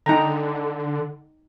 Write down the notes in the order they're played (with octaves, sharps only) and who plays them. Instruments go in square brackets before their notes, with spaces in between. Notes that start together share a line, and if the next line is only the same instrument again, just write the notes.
[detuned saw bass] D3 [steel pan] D#4 G5 A#5